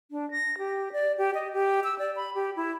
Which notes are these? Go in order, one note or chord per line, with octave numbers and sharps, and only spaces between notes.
D4
A#6
G4
D5
G4
D#5
G4
E6
D5
B5
G4
E4